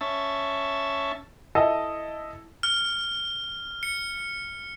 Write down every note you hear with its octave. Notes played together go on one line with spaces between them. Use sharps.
C#4 E5 A5
E4 A4 D#5
F6
C#7